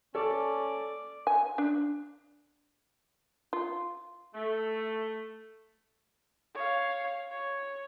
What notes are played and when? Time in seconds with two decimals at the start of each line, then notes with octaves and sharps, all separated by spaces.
0.15 C#4 A4 D5
1.27 G#5
1.58 D4
3.53 F4
4.34 A3
6.54 C#5 F5
7.31 C#5